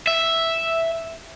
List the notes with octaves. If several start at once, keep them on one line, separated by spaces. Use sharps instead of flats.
E5